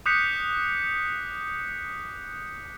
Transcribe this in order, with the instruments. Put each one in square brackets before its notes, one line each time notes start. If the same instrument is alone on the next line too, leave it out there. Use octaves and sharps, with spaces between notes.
[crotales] D6 D#6 F#6 G6 B6 C#7